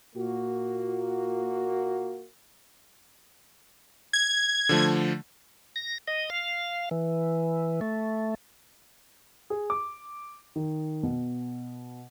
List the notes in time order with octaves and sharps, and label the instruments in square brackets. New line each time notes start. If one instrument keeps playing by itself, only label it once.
[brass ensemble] A#2 A#3 F#4
[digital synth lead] G#6
[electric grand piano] D3 F3 A3
[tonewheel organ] A#6
D#5
F5
E3
A3
[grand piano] G#4
D6
D#3
B2